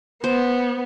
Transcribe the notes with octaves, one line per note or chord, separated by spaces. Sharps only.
B3 C5